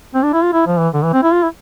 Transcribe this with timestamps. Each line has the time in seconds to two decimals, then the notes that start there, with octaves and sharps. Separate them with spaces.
0.15 C4
0.23 D4
0.33 E4
0.43 F4
0.53 E4
0.67 F3
0.79 E3
0.94 D3
1.03 E3
1.13 C4
1.23 E4
1.33 F4
1.43 E4